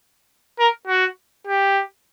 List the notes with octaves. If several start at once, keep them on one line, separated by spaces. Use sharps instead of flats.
A#4
F#4
G4